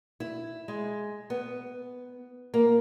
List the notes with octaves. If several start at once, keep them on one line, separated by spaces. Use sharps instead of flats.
E4
G#3
B3
A#3